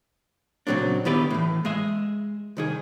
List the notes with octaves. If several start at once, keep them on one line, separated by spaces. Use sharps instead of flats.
A#2 C#3 F#3 C4 D4
D#3 B3 E4 G4 B4 D5
A2 E3
G#3 D#5 E5
C2 D#3 G#4